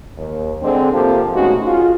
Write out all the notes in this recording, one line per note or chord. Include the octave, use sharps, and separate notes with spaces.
D#2
D3 G#3 C4
C3 F3 A#3 G4 A4
B2 G#3 A3 C#4 D#4 F#4
F4 G#4